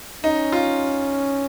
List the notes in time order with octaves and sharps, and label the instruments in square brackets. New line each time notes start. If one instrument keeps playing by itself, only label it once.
[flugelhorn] C#4 [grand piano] D#4
[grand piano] F4